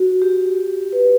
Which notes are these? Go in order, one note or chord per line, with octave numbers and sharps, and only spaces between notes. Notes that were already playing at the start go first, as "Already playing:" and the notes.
Already playing: F#4
G4
B4